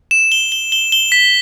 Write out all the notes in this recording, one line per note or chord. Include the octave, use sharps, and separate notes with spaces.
E7
G7
G7
G7
G7
B6